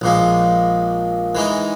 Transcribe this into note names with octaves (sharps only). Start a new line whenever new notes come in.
A#1 A#2 G#3
E3 G#3 D#4